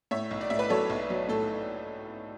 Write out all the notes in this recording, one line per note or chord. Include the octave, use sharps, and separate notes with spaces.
A2 C#5 E5
B1
D5
A2 E5
B4 D5
F#3 A4 C#5
B1
F#3
A2 A4